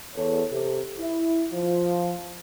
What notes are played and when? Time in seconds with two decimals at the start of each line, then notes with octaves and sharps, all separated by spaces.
0.15 E2 A4 C#5
0.51 C3 G4 A4
0.98 E4
1.52 F3 F4